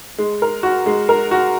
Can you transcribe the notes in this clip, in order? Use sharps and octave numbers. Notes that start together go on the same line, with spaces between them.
G#3
A#4
F#4
G#3
A#4
F#4